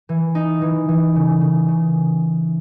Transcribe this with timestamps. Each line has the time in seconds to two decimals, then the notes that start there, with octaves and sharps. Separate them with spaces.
0.09 E3
0.35 D#4
0.62 E3
0.89 E3
1.16 C#3
1.41 C#3
1.68 C#3